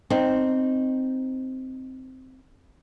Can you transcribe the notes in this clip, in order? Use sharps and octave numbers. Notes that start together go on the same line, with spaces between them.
C4 D#4